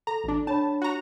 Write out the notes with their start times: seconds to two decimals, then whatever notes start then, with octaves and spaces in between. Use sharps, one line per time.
0.07 A4 A#5
0.24 A1 D4
0.47 D4 C#5 A5 B5
0.82 F#4 A#5